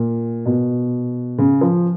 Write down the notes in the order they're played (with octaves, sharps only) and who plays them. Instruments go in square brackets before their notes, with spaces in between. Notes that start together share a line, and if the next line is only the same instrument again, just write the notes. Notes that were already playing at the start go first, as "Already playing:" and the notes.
Already playing: [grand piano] A#2
B2
C#3
F3